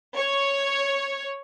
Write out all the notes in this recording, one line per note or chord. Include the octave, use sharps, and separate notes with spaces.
C#5